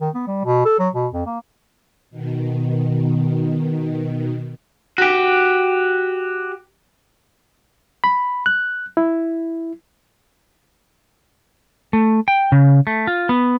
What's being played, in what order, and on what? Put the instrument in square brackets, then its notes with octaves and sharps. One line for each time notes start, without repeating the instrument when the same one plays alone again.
[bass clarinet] D#3
B3
G3
B2
A4
F#3
B2
F2
A#3
[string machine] B2 D#3
[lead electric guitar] F#4 G4
[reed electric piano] B5
F#6
E4
[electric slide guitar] A3
G5
C#3
A3
F4
B3